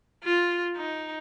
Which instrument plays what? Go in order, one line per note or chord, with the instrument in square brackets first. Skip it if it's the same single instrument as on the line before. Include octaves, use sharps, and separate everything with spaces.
[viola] F4
D#4